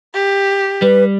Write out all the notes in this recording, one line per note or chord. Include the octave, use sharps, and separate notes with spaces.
G4
G3 B4